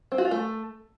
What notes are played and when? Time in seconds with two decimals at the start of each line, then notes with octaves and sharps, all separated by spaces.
0.12 C4
0.18 F#4
0.25 F4
0.31 A3